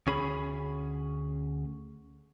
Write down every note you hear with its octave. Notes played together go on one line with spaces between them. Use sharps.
D2 C#4 G#4 B5